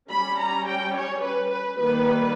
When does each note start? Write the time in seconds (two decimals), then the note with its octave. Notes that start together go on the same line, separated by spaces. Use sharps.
0.10 G3 C#4 B5
0.38 A#5
0.67 G5
0.95 C#5
1.23 B4
1.50 B4
1.78 D#3 G3 A#3 B4